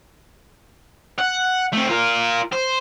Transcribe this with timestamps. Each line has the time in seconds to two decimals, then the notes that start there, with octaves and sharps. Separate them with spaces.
1.19 F#5
1.73 A3 C4
1.89 F4 A#4
2.53 C5